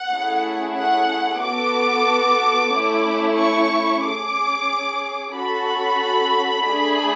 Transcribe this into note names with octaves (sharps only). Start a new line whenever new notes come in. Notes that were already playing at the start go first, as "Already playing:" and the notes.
Already playing: F#5
A3 C#4 E4 G#4
F#5
B3 F#4 A4 D6
A3 C#4 E4
C#6
C#4 G#4 D6
C#4 F#4 A4 B5
A3 D4 G#4